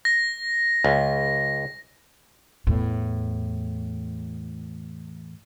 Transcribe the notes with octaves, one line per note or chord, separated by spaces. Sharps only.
A#6
C#2
E2 A2